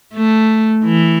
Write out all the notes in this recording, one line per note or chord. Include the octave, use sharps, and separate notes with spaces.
A3
E3